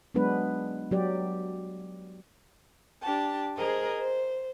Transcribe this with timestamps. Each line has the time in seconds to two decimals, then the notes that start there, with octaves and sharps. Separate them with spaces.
0.14 F#3 G#3 B3 D4 B4
0.91 F#3 G4 D5
3.02 D4 G4 A5
3.56 G#4 A#4 C5 D#5
3.98 C5